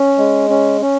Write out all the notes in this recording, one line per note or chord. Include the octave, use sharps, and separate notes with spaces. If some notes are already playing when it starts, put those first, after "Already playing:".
Already playing: C#4
G#3
C#4
C#4